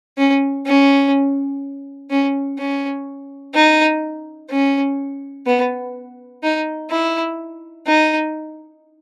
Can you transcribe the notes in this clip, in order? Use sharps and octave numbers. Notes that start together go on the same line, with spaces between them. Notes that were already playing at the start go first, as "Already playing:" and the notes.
C#4
C#4
C#4
C#4
D#4
C#4
B3
D#4
E4
D#4